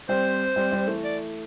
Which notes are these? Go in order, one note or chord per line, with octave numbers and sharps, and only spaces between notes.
G3 C4 C5
G3 C4
G3 C4
E3 A3
D5